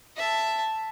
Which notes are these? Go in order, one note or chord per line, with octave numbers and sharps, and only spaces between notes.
E5 A5